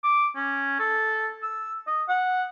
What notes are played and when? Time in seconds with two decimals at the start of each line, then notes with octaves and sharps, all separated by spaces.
0.04 D6
0.36 C#4
0.79 A4
1.43 E6
1.87 D#5
2.09 F#5